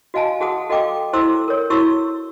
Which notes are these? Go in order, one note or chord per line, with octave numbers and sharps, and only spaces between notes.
F#4 D#5 F5 G#5 A5
F#4 G#4 F#5 A5 D#6
F#4 A4 D#5 F5 G5 D6
E4 A4 C5 C6 D6 E6
A#4 C#5
E4 F#4 C6 C#6 E6